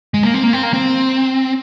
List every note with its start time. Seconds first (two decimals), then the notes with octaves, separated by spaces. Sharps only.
0.14 G#3
0.23 A#3
0.34 C4
0.43 A#3
0.53 C4
0.63 A#3
0.73 C4